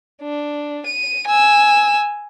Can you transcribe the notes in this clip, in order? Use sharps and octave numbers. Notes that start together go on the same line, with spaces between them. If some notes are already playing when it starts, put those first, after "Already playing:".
D4
D#7
G#5 E6